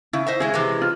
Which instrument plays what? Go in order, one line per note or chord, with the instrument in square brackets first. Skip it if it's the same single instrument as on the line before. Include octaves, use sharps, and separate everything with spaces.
[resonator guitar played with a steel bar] C#3 [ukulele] E4
[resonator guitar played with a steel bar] C5 D#5 E5
[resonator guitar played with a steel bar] C#3 G#3 G#4 [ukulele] E4
[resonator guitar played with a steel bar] C3 E3 G#3
[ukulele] F4